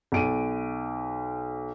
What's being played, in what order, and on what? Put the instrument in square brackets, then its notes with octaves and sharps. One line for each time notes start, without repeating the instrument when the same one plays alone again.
[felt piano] B1 D7 D#7